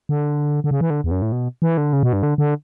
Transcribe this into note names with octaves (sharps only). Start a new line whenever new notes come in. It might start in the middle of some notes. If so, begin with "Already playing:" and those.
D3
D3
C#3
E3
D3
E2
F#2
A2
B2
E3
D3
C#3
B2
G2
D3
D3